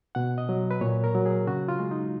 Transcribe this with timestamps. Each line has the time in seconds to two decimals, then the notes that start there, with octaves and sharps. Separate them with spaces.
0.15 B2 F#5
0.38 D#5
0.49 F#3
0.71 B4
0.81 A#2 C#5
1.04 A#4
1.15 F#3
1.26 G#4
1.47 C#3 F#4
1.68 F4
1.80 G#3
1.91 D#4